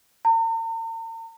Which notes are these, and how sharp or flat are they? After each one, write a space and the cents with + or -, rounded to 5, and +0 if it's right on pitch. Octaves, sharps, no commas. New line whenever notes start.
A#5 -45